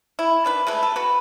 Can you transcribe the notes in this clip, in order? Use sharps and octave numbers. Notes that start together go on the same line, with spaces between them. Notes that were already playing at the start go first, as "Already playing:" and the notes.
E4
D#3 D4 B4
G#3 A3 B4
A4
F#4 B4